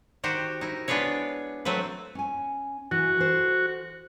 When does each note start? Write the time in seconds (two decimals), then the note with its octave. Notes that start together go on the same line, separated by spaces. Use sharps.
0.23 D#3 F#4 G4 C5
0.61 D#4 E4
0.88 G#3 B3 D4 G#4 B4 C#5
1.65 F#3 A3 C4 B4
2.15 C#4 G#5
2.91 E3 F#4
3.17 A4 C5